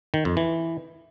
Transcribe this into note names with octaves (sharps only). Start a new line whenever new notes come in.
D#3
F2
E3